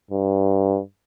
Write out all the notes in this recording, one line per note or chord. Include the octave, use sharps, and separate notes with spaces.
G2